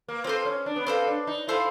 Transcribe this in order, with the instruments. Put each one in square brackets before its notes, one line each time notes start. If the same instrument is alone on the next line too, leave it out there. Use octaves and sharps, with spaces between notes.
[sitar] A#3
[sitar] C4 [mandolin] F4 A4 C5
[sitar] C#4
D4
B3
[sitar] C4 [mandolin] F4 A4 C5
[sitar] D4
D#4
[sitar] E4 [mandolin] F4 A4 C5